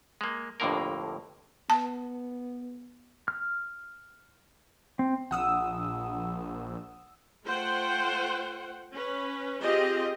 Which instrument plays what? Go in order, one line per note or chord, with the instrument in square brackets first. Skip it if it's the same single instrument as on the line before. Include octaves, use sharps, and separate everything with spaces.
[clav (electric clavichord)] G#3 A#3
G1 F2 A2 D3 A#3 A#4
[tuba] B3 [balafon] A5
[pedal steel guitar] F6
C4
[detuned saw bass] A#1 [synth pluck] F#5 D#6 E6
[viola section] A3 F4 C5 F#5 G5
C#4 B4
C4 F4 G4 G#4 D#5